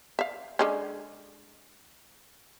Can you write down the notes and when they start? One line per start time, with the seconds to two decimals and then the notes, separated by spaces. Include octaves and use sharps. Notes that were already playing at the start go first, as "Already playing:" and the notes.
0.19 E5 F5
0.59 D3 G#3 C#4